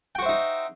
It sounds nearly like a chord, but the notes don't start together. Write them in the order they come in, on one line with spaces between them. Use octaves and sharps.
G5 F#4 C5 E5 D#4